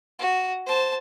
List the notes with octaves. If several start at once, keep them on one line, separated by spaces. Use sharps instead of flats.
F#4
C5 A5